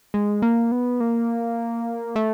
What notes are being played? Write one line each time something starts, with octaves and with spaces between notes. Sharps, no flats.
G#3
A#3
B3
A#3
A3